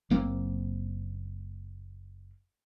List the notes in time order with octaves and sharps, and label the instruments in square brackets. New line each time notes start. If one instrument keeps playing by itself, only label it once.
[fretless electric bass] F#1 A#3 C4